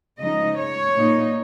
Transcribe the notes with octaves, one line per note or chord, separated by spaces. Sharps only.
C#3 F3 G#3 D#4 D#5
C#5
A#2 A#3 D#4